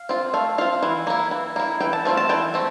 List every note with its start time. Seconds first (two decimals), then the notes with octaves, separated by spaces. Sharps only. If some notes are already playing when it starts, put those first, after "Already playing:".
Already playing: F5
0.09 C4 F4
0.34 A3 F5
0.58 C4 F4 F5
0.83 E3
1.07 A#3 E4
1.31 E3
1.56 A#3 E4
1.80 E3 G5
1.93 A5
2.05 A3 C4 F4
2.17 A5
2.29 E3 G5
2.54 A3 C4